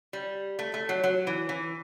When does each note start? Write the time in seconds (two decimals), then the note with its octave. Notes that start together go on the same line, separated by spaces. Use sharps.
0.13 G3
0.59 A3
0.74 A3
0.89 F#3
1.04 F#3
1.27 E3
1.49 E3